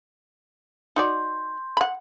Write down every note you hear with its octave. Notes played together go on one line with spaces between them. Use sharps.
D#4 F#4 D5 C6 G6
F#5 B5